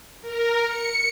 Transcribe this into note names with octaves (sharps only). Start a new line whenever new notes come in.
A#4
C#7